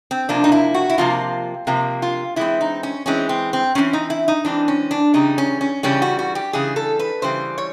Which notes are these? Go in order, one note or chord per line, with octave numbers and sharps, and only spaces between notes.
C4
C3 F3 A#3 D4
D#4
E4
F#4
E4
C3 F3 A#3 F4
C3 F3 A#3
F4
E3 G#3 C4 E4
D#4
C#4
E3 G#3 C4 C#4
C4
C4
E3 G#3 C4 C#4
D#4
E4
D#4
E3 G#3 C4 D4
C#4
D4
C#3 E3 G3 D#4
C#4
C#4
C#3 E3 G3 C#4
F#4
F#4
G4
C#3 E3 G3 G#4
A4
B4
C#3 E3 G3 C5
C#5